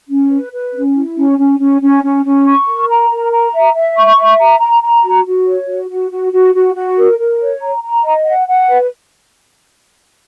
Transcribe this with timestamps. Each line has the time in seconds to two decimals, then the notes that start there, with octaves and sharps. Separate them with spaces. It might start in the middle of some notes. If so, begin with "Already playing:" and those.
0.09 C#4
0.31 B4
0.52 B4
0.74 C#4
0.96 E4
1.17 C#4
1.38 C#4
1.59 C#4
1.81 C#4
2.03 C#4
2.24 C#4
2.46 C#6
2.68 A#4
2.89 A#5
3.10 A#4
3.32 A#5
3.54 E5
3.74 E5
3.96 C#6
4.18 E5
4.40 A#5
4.60 A#5
4.82 A#5
5.03 F#4
5.25 F#4
5.47 C#5
5.68 F#4
5.89 F#4
6.11 F#4
6.33 F#4
6.54 F#4
6.75 F#4
6.97 A#4
7.19 A#4
7.40 C#5
7.61 A#5
7.83 A#5
8.04 D#5
8.26 F#5
8.47 F#5
8.69 B4